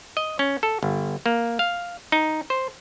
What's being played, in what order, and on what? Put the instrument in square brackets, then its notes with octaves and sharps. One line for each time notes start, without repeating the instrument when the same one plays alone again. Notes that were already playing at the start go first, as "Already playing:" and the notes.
[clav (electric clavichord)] D#5
C#4
A4
G1
A#3
F5
D#4
C5